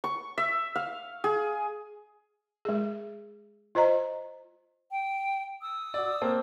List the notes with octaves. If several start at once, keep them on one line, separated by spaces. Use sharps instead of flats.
C#6
E5
F5
G#4
G#3 G#4
F4 C5 D#5 A#5
G5
D#6 E6
F#4 D5
A#3 C4 A5